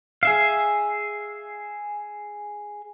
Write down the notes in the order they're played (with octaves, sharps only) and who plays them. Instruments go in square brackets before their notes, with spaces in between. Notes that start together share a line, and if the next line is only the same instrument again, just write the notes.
[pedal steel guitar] G#4 E5 F5